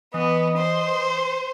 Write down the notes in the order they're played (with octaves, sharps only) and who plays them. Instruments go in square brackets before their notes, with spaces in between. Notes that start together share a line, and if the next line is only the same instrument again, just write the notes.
[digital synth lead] E3 [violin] B3 [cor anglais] D#5
[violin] C5